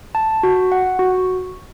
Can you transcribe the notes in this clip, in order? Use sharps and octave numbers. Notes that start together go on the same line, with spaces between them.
A5
F#4
F#5
F#4